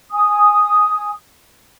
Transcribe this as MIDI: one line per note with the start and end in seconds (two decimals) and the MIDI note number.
0.11 1.11 80
0.11 1.11 87